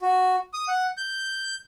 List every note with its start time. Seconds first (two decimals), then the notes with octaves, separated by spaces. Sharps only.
0.01 F#4
0.53 D#6
0.68 F#5
0.97 G6